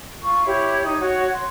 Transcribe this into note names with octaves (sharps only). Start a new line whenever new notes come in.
F4 C#6
E4 G4 C#5
D#4
F#4 C#5
C6